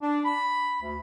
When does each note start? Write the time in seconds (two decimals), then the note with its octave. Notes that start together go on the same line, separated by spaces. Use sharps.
0.02 D4
0.25 B5
0.82 D2